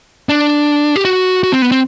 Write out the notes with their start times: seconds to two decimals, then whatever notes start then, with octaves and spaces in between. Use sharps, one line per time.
0.29 D4
0.96 G4
1.05 F#4
1.43 F#4
1.52 C4
1.62 B3
1.72 C4